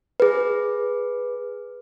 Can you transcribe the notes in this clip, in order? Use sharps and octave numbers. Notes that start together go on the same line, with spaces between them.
G#4 B4